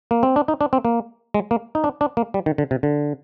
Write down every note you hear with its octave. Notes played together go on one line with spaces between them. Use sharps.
A#3
C4
D4
D#4
D4
C4
A#3
G#3
A#3
D#4
D4
D4
A#3
G3
D#3
D3
C3
D3